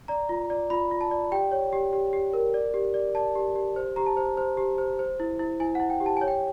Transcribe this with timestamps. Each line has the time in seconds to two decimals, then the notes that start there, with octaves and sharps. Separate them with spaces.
0.08 D5 A#5
0.29 F4
0.50 D5
0.70 F4 B5
0.91 F4
1.01 A5
1.11 D5
1.31 G4 G5
1.52 C#5
1.73 G4
1.93 G4
2.13 G4
2.33 A#4
2.54 D5
2.74 G4
2.94 D5
3.15 D5 A5
3.35 G4
3.56 G4
3.76 C5
3.96 G4 A#5
4.06 A5
4.17 C5
4.37 C5
4.57 G4
4.78 C5
4.99 C5
5.20 E4
5.39 E4
5.60 E4 G#5
5.75 F#5
5.80 E4
5.90 G5
6.00 G4
6.06 A5
6.17 C#5 G#5
6.28 G5